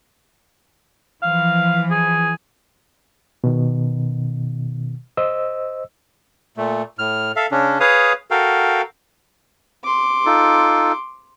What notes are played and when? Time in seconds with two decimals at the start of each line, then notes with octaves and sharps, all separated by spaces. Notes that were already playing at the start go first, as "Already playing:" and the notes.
1.22 E3 F3 F5
1.90 G#4
3.44 B2 D#3
5.17 C5 D#5 E6
6.57 A#2 A3
6.99 A2 F6
7.36 A4 E5 F5
7.51 C#3 C#4 D4
7.80 G#4 B4 C#5 F5 D#6
8.31 F#4 A4 A#4 F5 G5
9.84 C6 D6
10.26 D#4 F4 A4